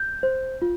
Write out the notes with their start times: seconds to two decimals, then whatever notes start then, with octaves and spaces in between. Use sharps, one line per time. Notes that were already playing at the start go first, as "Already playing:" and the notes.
Already playing: G6
0.23 C5
0.62 F4